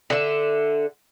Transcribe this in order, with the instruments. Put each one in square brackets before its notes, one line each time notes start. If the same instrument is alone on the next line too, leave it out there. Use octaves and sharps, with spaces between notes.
[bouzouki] D3 E5